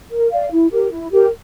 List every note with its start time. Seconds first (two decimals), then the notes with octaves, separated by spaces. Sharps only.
0.11 A#4
0.31 D5 F5
0.52 E4
0.71 G4 A#4
0.91 E4
1.11 G4 A#4